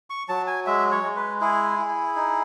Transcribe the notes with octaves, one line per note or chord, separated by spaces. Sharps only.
C#6
F#3 A5
G#5
G#3 E5
C#5
G#3
B4
E4 G#4
E4
D#4